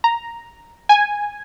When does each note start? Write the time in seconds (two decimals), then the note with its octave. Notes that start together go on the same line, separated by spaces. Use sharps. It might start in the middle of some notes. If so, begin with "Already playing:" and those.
0.04 A#5
0.89 G#5